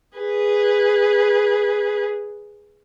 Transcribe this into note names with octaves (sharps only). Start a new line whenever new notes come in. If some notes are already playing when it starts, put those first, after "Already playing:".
G#4 B4